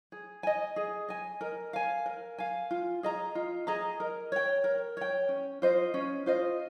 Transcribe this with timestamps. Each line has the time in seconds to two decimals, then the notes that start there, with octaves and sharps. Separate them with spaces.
0.12 G#4
0.43 D#5 G#5
0.76 G#4
1.09 D#5 G#5
1.41 A#4
1.73 F5 G#5
2.06 A#4
2.38 F5 G#5
2.71 F4
3.03 G#4 D#5 A#5
3.35 F4
3.67 G#4 D#5 A#5
4.00 A#4
4.32 C#5 G5
4.64 A#4
4.97 C#5 G5
5.29 C#4
5.62 F4 C5 D#5
5.94 C#4
6.26 F4 C5 D#5